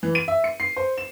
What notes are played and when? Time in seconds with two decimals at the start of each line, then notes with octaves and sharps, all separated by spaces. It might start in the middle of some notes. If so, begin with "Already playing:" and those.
0.03 E3
0.15 D#7
0.28 E5
0.44 C#7
0.60 C7
0.77 C5
0.98 E7